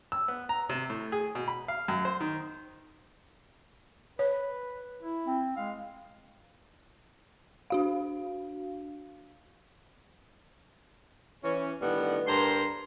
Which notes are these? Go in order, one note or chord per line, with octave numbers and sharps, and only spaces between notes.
E6
B3
A#5
C3
A2
G#4
B2
B5
F5
F#2
C5
D#3
B4 C#5
E4
C4
G#3 F5
D4 F#4 F5
E3 C#4
A2 D3 D#3 G3 B3
G2 D3 A#4 C5 A#5 C6